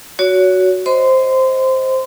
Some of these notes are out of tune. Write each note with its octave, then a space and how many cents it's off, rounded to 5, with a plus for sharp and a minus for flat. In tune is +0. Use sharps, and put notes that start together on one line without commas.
F#4 +0 C#5 +30
C5 +0 D#5 +20 C6 -30